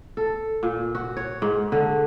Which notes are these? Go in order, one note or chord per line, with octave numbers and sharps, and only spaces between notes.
A4
A#2
F#4
C#5
G#2
D3